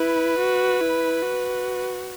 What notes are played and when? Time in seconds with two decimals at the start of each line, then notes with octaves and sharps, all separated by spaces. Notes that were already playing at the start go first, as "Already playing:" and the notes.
Already playing: E4 B4
0.39 F#4
0.81 E4
1.22 F#4